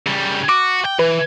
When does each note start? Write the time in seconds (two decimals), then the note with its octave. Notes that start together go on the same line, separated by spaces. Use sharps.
0.07 C#3 G3
0.49 F#4 D6
0.85 G5
0.99 E3 B4